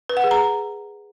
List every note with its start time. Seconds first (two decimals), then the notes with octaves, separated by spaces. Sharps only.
0.09 B4
0.17 F#5
0.24 G#4
0.31 A#5